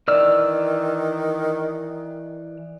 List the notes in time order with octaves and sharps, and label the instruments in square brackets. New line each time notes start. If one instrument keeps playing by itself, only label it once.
[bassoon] D#3 [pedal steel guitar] E3 E6 F6 [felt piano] D5